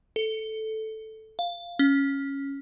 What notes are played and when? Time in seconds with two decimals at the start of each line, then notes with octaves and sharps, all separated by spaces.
0.16 A4
1.39 F5
1.79 C#4